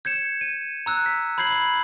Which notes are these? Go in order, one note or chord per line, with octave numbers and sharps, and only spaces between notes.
G6 G#6 C#7 E7
D#7
A#5 E6 F#6
B6
B5 G6 G#6 C7 F#7